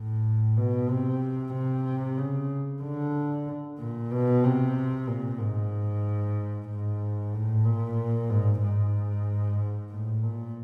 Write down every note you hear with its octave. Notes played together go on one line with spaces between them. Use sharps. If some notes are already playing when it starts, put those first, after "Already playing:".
Already playing: A2
B2
C3
C3
C#3
D3
A#2
B2
C3
A#2
G#2
G#2
A2
A#2
G#2
G#2
A2
A#2